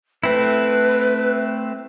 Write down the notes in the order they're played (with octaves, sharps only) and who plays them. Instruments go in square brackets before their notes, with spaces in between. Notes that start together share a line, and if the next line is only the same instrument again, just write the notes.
[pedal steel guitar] A3 C4 E4 [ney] B4